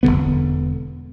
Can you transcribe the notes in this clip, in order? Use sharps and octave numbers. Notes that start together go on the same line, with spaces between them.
E1 F2 D3 B3